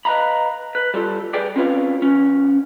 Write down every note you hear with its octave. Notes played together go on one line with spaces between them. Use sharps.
B4 D#5 F5 A#5 B5
B4
G3 F4 A4
G4 G#4 B4 D5 G5
C4 C#4 F4 B4 C#5 F5
E2 C#4